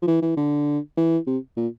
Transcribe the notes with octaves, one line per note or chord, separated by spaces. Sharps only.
F3
E3
E3
D3
E3
C3
A#2